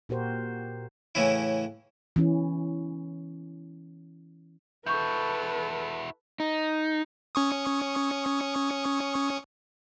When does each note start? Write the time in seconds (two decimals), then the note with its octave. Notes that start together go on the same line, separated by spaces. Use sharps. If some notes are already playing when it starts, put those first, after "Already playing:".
0.09 A#2 F#4 G4 A#4 C5
1.15 A2 C#3 E3 C#4 E4
2.16 E3 C#4
4.86 E4 F#4 A4 B4 C#6 G6
6.40 D#4
7.35 C#4 C#6 D#6